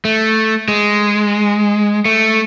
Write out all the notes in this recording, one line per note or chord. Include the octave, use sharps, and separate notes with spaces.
A3
G#3
A3